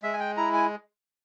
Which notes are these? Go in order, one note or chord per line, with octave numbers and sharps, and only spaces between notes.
G#3 E5
G#5
G5
E4 A#5
G#5